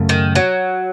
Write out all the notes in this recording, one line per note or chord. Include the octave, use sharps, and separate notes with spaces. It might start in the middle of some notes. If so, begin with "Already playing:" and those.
Already playing: F#2 C#3 A3
D#3
F#3